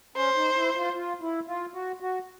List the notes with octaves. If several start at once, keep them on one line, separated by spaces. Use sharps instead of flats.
C#4 C5
D#4
E4
F4
F4
E4
F4
F#4
F#4